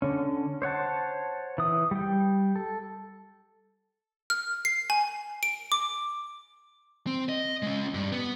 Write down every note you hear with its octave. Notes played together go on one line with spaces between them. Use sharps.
D3 C#4
C5 C#5 F#5 A5
E3 D#6
G3 G5
A4
F6
C7
G#5
D7
D6
C4
D#5
G#3 C#4
G2
B3